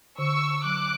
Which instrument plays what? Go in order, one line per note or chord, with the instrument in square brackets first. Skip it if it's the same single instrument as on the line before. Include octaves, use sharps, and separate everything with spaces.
[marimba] D3 [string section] C#6 E6
[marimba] F#3 [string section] D6 F#6